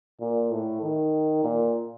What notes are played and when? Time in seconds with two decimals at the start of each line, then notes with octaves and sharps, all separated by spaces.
0.20 A#2
0.51 A2
0.82 D#3
1.43 A#2